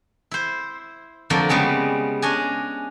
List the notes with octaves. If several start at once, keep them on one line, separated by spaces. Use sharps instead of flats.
E4 C5
F2 D3 F3 A3 A#3 D4
C#3 G3 G#3 B3
C#4 D4 D#5 G#5